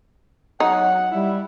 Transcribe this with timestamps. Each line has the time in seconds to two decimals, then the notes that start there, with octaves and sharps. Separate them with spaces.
0.60 F#3 D#4 F#5
1.12 G3 E4 E5